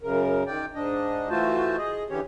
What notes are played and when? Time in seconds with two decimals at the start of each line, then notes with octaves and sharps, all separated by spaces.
0.01 F#2 C#3 A#4
0.47 D#3 D5 G5
0.75 G#2 D4 D#5
1.30 E3 A3 F4 F#4 C5 A5
1.77 G#4 D#5
2.10 D3 E3 C#4 G4 C#5